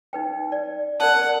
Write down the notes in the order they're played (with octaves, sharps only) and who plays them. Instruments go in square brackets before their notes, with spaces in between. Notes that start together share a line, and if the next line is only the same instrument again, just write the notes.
[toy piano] D#4 B4 G5
D5
[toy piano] A#4 D5 A5 [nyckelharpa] F#5